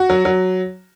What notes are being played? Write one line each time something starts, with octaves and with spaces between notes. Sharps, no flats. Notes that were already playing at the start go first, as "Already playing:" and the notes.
Already playing: F#4
F#3
F#3